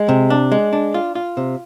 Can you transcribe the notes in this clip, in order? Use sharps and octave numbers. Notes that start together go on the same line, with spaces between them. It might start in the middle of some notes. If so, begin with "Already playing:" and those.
Already playing: G#3
C3
D4
G#3
D4
F4
F4
C3